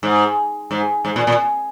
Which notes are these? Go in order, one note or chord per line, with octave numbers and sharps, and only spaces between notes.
G#2
G#2
G#2
A#2
A#2